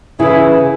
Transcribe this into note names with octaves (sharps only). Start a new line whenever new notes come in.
C#3 E3 E4 G#4